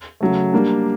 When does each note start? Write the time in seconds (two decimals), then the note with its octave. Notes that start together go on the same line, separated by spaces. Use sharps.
0.21 C#3 F#3 A3
0.53 G3 A#3 D4